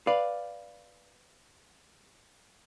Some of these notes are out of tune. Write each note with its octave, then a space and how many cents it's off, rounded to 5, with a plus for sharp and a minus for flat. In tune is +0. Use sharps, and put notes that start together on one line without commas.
B4 +0 D5 +0 F5 +0